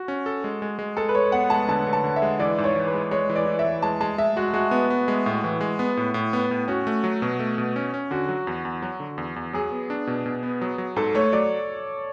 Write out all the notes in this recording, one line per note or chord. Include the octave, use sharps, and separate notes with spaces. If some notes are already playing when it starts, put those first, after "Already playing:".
Already playing: F#4
C#4
A4
G#3
G#3
G#3
G#3 A4
B4
G#3 C#5
B3 F#5
G#3 A5
D3 A5
D3
A5
D3
E5
G#3
E3 D5
G#2
C#5
E3
B4
G#3
G#3 C#5
E3
D5
E3
E5
E3
G#3 A5
G#3 A5
G#3 E5
G#3 F#4
G#3 F#4
B3
B3
G#3
A2
E3
G#3
B3
A2
A2
B3
A2
C#4 F#4
A3
F#3
B2
A3
B2
C#4
C#4
D3 F#4
F#3
E2
E2
F#3
D3
E2
E2
F#3 G#4
B3
D4
B2
B2
B3
F#3
F#3
G#2 A4
A3 C#5
F#3 D5